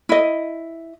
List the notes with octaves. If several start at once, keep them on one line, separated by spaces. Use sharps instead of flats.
E4 D#5